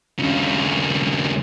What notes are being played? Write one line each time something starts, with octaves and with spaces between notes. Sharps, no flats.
D#2 C#3